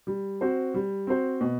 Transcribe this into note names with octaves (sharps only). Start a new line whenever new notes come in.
G3
C4 F#4 C5
G3
C4 F#4 C5
B2